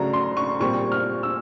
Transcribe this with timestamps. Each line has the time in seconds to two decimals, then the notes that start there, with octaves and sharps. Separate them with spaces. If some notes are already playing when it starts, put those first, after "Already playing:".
Already playing: C#3 F#3 A3 D4 A#5
0.13 C6
0.37 C#6
0.60 A#2 G3 C4 C#6
0.92 F6
1.23 E6